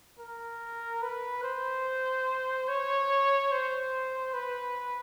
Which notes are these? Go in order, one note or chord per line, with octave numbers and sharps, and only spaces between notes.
A#4
B4
C5
C#5
C5
B4